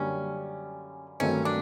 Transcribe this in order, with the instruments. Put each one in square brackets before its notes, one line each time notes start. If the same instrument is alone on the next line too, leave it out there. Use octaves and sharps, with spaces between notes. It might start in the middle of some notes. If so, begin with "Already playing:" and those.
Already playing: [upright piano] F#2 D3 G3 A#3 [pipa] C#4
[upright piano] G2 D#3 F#3 A3 C4 [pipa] C#4
[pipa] D4